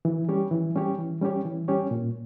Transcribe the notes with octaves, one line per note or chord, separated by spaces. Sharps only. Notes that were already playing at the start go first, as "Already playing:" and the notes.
E3
G3 C#4 G4 C#5
E3
G3 C#4 G4 C#5
E3
G3 C#4 G4 C#5
E3
G3 C#4 G4 C#5
A#2